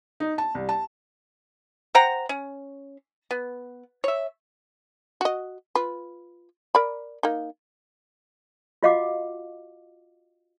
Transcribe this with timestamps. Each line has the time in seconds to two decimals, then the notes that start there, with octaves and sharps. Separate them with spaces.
0.20 D#4
0.38 A5
0.55 C2
0.69 A5
1.95 C5 F#5 G5 A#5
2.29 C#4
3.31 B3
4.04 C#5 E5
5.21 F#4 D#5
5.75 F4 B4
6.75 A#4 D5 B5
7.23 A#3 D#4
8.83 F4 F#4 D#5 F5 F#5 D6